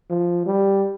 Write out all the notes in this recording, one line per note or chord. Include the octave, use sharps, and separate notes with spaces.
F3
G3